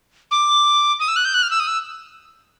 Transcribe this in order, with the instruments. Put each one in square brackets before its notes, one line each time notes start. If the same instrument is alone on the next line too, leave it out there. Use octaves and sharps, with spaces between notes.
[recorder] D6
D#6
E6
F#6
G6
F#6
F6
E6
D#6
E6